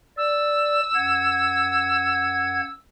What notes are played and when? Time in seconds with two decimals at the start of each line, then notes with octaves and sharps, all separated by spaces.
0.17 D5 E6
0.94 F#2 F#5 G#6